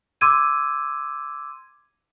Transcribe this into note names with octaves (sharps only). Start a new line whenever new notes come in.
C6 D6 E6 G#6 D#7